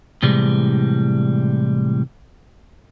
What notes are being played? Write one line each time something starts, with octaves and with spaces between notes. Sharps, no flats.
A2 C3 E3 G3 G#3